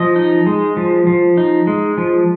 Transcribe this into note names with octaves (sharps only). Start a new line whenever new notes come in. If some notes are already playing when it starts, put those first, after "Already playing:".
Already playing: F3 D#5
D#4
G#3
F3
F3
D#4
G#3
F3